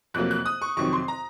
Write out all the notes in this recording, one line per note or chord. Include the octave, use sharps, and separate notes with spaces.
F2 C3 F#3 A#3 F#6
F#6
D#6
C#6
F2 C3 D#3 F#3 C4 C#6
C6
A#5